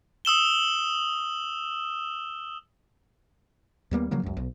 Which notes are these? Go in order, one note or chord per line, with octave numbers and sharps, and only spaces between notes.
D#6 E6 E7 G7
D#2 G3 A#3 B3
C#3 F3 F#3 A#3
C#2 F#2
B1